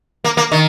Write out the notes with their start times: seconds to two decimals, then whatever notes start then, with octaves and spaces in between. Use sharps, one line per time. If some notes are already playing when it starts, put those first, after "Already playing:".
0.24 A#3
0.37 A#3
0.52 D#3